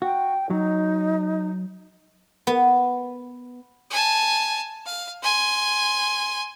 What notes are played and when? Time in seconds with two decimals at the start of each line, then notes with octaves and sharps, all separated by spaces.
0.02 F#4 G5
0.50 F#3 D#4
2.47 B3
3.90 G#5 A5
4.86 F5
5.22 G#5 C6